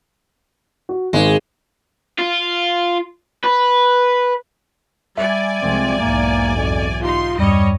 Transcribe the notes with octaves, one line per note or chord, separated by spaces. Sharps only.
F#4
G#1 G#3
F4
B4
G3 D5 E5 G#5
C2 F3 G#3 C4
B1 E2 G#2 A#3
F2
D#4 F4 G4 C6
E2 G2 G3 C#5 D#5